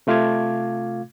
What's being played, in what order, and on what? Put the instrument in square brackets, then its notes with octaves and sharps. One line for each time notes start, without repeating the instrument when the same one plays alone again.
[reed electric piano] C3 A3 F4 F5 D6 G#6